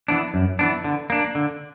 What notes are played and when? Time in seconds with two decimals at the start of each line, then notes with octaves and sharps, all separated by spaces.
0.08 E3 B3 D4
0.34 F#2
0.59 E3 B3 D4
0.84 D3
1.10 A#3 D4
1.35 D3